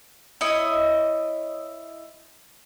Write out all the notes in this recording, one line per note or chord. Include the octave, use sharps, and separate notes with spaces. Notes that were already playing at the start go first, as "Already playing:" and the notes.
E4 C#5 D#5